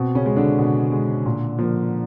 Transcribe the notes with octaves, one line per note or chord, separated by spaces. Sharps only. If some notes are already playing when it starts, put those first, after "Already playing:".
Already playing: B2 C4
C#3 C#4
G#3
D3 D4
B2
G#3
A#2
F3 A#3